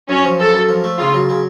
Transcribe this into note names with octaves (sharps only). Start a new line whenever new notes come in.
F#2 C#4
F3
F#2 A4
F#2
F3
A3
C#3 F4
F#3
C#3